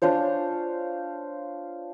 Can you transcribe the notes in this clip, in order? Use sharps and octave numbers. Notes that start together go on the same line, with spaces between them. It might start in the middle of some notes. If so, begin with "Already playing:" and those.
D4 F4 C5 C#5